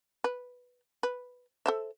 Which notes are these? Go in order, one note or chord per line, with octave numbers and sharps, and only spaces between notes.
B4
B4
A4 C5 E5